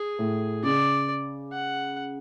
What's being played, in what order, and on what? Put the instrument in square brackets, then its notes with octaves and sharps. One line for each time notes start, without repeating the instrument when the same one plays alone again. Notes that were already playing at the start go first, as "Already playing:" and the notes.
Already playing: [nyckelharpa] G#4
[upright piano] A2
[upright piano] C#3 [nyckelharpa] D5
[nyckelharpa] F#5